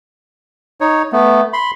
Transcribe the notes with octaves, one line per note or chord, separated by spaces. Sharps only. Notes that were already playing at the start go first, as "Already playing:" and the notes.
D#4 C#5
A3 B3
B5 C6